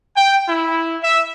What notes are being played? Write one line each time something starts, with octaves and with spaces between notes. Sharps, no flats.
G5
E4
E5